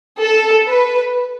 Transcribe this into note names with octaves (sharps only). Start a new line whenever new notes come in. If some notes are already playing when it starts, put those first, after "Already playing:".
A4
B4